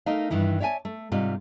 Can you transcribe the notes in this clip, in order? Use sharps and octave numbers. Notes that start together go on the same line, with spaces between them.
A3 D#4 A#4 D#5 F5
G2 D#3 E3 E4
C#5 D5 E5 F5 G#5 A5
A3
G#2 C3 G3 D#4 F4